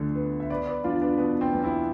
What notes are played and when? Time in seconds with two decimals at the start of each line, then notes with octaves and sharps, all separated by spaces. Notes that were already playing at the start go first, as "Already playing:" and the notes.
Already playing: D2 D3 F3
0.15 B3
0.40 E5
0.50 B3 B4 D5
0.67 B4 D5
0.84 E2 D4 F4
1.01 B3 D4
1.18 B2 B3
1.41 C4
1.52 E2
1.63 C4 E4